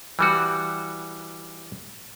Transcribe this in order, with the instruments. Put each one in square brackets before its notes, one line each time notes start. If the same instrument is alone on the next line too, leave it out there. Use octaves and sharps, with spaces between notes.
[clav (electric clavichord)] E3 G3 F#4